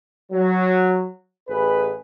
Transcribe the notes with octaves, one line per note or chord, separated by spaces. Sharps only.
F#3
A1 G#4 B4